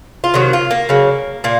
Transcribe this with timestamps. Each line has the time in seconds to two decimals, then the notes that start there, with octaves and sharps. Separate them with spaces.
0.24 F4
0.34 C3 D#3 F#3 F#4
0.53 F4
0.71 A#3
0.89 C#3 F#3
1.44 A#2 A#3